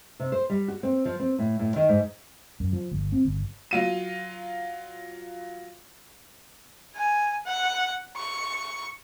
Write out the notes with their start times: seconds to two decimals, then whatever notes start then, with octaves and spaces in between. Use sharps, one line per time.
0.20 C3
0.32 C5
0.50 G3
0.68 F#4
0.83 C4
1.05 F3
1.20 C4
1.39 A2
1.59 A2
1.76 D#3
1.89 G#2
2.60 F#2
2.73 F3
2.91 G1
3.12 C4
3.25 G1
3.71 F#3 F4 D#7
6.95 G#5
7.46 F#5
8.17 C#6